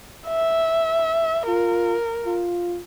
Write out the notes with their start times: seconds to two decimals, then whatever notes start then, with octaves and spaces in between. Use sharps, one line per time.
0.28 E5
1.48 F4 A#4
2.26 F4